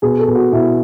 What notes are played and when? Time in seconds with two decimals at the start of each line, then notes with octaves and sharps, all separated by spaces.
0.02 B2 G#4
0.19 A4
0.28 B2
0.35 F#4
0.52 B2 E4